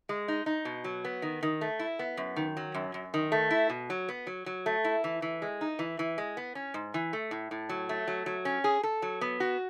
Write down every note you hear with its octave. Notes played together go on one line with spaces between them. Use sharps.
G#3
D#4
D#4
B2
F#3
B3
D#3
D#3
A3
E4
B3
F#2
D#3
F#3
F#2
F#2
D#3
A3
E4
B2
F#3
B3
F#3
F#3
A3
E4
E3
E3
G#3
D#4
E3
E3
G#3
B3
C#4
G#2
E3
A3
A2
A2
F#3
A3
F#3
F#3
C#4
G#4
A4
F#3
B3
F#4